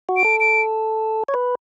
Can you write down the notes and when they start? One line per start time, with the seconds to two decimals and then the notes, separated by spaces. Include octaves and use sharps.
0.09 F#4
0.17 D7
0.25 A4
0.40 D7
1.28 C#5
1.34 B4